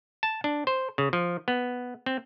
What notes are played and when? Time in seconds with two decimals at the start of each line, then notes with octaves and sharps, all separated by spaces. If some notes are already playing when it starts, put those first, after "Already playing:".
0.23 A5
0.44 D4
0.67 C5
0.98 C#3
1.13 F3
1.48 B3
2.06 C4